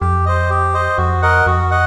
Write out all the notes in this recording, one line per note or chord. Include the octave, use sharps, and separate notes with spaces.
F2 G4
C5 D#5
G4
C5 D#5
F2 F#4
A#4 D#5 F#5
F2 F#4
D#5 F#5